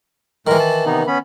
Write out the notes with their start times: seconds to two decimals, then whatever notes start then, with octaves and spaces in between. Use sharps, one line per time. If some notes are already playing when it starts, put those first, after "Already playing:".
0.47 A2 D#3 E3 G#3 A#4
0.60 A5
0.86 C3 B3 D#4
1.07 B3 C#4 B5